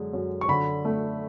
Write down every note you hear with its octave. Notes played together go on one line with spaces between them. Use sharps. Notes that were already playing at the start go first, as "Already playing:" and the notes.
Already playing: F#2 D3 G#3
F#2
C#6
D3 B5
A3